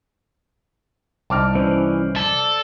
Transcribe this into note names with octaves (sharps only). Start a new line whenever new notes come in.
C2 D#4 A5 D6 F6
E3 C#4 C5 D5
A4 D5 A5